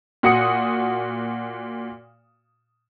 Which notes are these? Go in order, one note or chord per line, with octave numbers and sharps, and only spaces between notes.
A#2 F#4 F#5 D#6 C#7